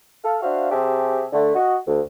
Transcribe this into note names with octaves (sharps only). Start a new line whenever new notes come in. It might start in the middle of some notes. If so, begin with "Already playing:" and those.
A4 F5
D4 F#4 C5 E5 F5
C3 C4 G4 G#4 E5 A5
D3 A3
F#4 D#5
D2